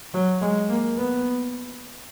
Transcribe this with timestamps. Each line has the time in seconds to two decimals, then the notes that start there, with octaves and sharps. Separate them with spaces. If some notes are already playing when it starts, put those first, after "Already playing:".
0.14 F#3
0.42 G#3
0.69 A#3
0.98 B3